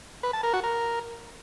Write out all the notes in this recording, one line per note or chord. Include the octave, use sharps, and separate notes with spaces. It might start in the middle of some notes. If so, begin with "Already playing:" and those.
B4
A5
A#4
F#4
A#4